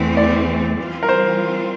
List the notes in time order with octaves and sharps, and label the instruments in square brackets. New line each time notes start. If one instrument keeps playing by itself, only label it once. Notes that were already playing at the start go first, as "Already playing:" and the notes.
Already playing: [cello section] E2 E3 A3 C4
[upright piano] D5
[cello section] E3 G3 C4 F4
[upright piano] A#4
C5